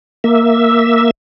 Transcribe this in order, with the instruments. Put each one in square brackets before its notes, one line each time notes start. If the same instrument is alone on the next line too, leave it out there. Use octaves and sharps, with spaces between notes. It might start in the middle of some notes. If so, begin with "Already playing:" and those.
[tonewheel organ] A#3 E5